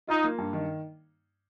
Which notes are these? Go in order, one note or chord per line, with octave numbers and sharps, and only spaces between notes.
D#4 F4
A#3
G2
D#3